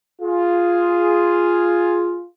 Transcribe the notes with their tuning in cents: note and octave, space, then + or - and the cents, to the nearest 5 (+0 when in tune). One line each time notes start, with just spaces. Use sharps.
F4 +0 G#4 +0